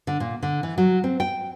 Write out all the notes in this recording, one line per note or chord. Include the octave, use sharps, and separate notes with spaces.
D3
A#2
D3
E3
F#3
C4
G5